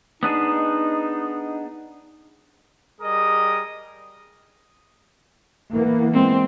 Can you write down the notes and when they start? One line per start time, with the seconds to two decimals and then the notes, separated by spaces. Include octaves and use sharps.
0.23 B3 D4 D#4 G#4
3.01 G3 G#4 A#4 D#5 D#6
5.73 E3 A#3 B3
6.12 G#3 C4